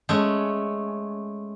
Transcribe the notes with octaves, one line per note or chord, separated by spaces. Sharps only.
G#3 A3 C#4